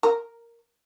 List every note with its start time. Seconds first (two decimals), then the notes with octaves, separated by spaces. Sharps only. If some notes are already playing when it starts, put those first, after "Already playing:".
0.03 A#4